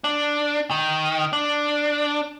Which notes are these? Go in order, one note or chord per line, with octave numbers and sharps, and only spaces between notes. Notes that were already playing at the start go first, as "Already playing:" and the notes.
D4
D#3
D4